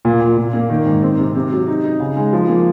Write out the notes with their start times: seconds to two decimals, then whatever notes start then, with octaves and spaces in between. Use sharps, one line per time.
0.05 A#2
0.21 A#2
0.37 A#2
0.53 A#3
0.70 D#3
0.86 G#2
1.03 C4
1.19 C3
1.35 C3
1.52 F#3
1.68 D#4
1.84 D#4
2.00 C#3
2.17 G#3
2.33 F3
2.49 A#3